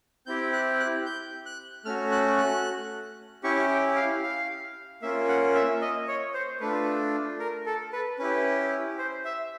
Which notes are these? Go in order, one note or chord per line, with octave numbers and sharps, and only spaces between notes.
C4 E4 G4 G6
F#6
F#6
G6
F#6
A3 C#4 F#4 F6
F#6
F#6
C#4 E4 G4 C#6
G5
F5
F5
A#3 C#4 F4 E5
F#5
E5
D#5
C#5
C5
A3 D4 F4 B4
A#4
A4
B4
C#4 E4 G4 B4
C5
E5